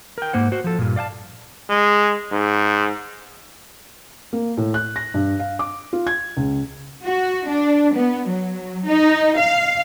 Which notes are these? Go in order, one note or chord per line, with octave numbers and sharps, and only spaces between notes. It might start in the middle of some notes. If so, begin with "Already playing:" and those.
A#4 G5
G#2 A#3 C5 F#5
F#4 C5
F3 A4
G2 A#2
D5 F5 G5 A5
G#3
G#2
A#3
A2
F#6
A#6
G2
F5
D6
F4
G#6
C#2
F#4
D4
B3
F#3
D#4
F5